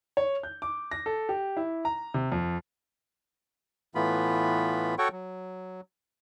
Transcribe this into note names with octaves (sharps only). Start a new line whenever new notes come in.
C#5
G6
D6
A#6
A4
G4
E4
A#5
C3
F2
A2 E3 A3 B3 F4 B5
F#4 A4 C#5 F#5 G5 C#6
F#3